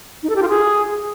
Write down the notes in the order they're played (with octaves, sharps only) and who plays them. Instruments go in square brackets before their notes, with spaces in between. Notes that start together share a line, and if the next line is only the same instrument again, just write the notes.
[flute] D#4
A4
G4
F4
G#4